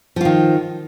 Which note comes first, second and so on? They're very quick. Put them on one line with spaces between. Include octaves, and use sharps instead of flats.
F3 F4 D#3